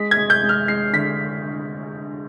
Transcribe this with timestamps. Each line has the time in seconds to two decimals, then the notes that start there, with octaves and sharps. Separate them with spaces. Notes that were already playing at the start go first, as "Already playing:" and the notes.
Already playing: G#3 B6
0.11 G#6
0.17 G#3
0.30 G6
0.43 G#3
0.49 F6
0.68 G#3 C7
0.93 D3 B6